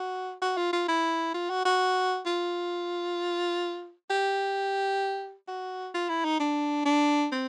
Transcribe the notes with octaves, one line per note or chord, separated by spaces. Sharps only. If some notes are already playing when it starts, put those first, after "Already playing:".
Already playing: F#4
F#4
F4
F4
E4
F4
F#4
F#4
F4
G4
F#4
F4
E4
D#4
D4
D4
C4